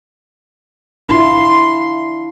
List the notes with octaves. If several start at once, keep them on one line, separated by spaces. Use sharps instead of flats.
D4 E4 F4 C6